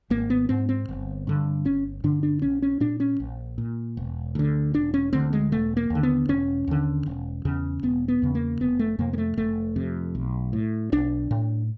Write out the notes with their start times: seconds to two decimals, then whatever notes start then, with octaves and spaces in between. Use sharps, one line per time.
0.10 G#1 A#3
0.30 B3
0.49 G#2 C4
0.69 C4
0.89 G1
1.27 G2 D3
1.65 G1 C#4
2.04 G2 D3 D4
2.23 D4
2.42 A#1 C#4
2.62 C#4
2.80 A#2 D4
3.00 C#4
3.20 A#1
3.58 A#2
3.97 E1
4.35 D2 D3
4.74 E1 D4
4.94 C#4
5.13 D2 D3 C4
5.33 G#3
5.52 E1 A3
5.77 A#3
5.90 D#2 D3
6.03 B3
6.29 E1 C#4
6.67 D#2 D3
7.06 E1
7.45 E2 C#3
7.83 E1 B3
8.08 B3
8.22 E2 C#3
8.35 A#3
8.61 F1 B3
8.79 A3
8.99 F2 C3 A#3
9.13 A#3
9.18 A3
9.37 F1 A3
9.76 F2 C3
10.15 B1
10.53 A2
10.92 B1 D4
11.31 A2